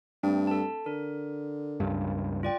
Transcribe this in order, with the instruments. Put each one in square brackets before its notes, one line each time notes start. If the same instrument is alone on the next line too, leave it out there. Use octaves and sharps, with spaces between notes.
[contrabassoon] G2 [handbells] A3 C4 D4
[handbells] A4 A5
[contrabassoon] D3 [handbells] A#4
[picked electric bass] C#2 G2
[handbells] F4 D5 G5